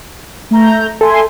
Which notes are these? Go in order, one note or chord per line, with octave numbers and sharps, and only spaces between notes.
A3 A#5 G6
A4 E5 G#5 C6